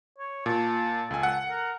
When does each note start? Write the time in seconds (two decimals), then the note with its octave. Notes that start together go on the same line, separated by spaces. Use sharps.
0.18 C#5
0.46 A#2 A5
1.11 C#2 A4 G#5
1.23 F#5
1.49 A#4